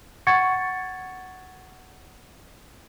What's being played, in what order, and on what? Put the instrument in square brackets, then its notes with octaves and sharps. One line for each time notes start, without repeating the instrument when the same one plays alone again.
[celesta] F#5 C#6 G#6 A6 C#7